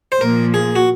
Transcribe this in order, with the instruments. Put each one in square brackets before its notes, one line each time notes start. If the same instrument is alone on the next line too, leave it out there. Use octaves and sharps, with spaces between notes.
[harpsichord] C5
[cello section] A#2 F3 A#3 [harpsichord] A#4
[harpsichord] G#4
F#4